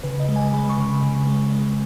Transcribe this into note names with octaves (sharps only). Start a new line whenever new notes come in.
C#3 B4
D#5
G#3
G#5
G#3 B5
C#6
C#3
B5
C#3
G#3
G#3